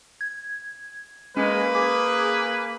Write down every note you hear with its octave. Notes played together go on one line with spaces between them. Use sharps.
G#6
G#3 A#3 C#4 B4
G#4 D6